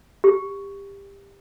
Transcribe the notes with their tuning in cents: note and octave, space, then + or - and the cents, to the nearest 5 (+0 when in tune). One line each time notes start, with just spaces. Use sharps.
G4 +20